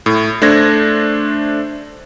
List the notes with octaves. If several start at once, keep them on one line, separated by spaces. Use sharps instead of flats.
A2
A3 D4 C5 G#6 A#6